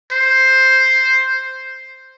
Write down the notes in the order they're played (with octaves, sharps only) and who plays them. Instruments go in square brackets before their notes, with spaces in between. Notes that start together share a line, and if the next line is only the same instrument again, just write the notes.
[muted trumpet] C5